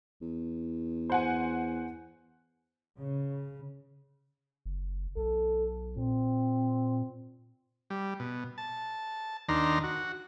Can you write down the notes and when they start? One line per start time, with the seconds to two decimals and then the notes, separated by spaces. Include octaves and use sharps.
0.21 E2
1.10 C5 F#5 G#5
2.99 C#3
4.66 F#1
5.16 B1 A4
5.96 A#2 C4
7.90 G3
8.20 B2
8.58 A5
9.48 D#2 D#3 D4 A#5 C6
9.84 F#4